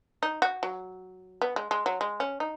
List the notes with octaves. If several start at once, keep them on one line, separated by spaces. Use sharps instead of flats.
D#4
F#4
F#3
B3
G#3
G#3
F#3
G#3
C#4
D#4